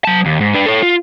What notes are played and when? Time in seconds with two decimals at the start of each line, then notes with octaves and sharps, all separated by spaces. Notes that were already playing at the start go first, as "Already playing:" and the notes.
0.05 F#3 A5
0.26 D#2
0.41 G#2
0.54 D4 B4
0.66 A4 C#5
0.83 F4